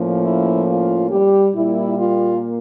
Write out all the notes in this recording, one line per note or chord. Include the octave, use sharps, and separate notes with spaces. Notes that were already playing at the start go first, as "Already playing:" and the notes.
Already playing: A2 F3 A#3 C#4
E4
F4
G3 G4
A#2 G3 A#3 E4
F4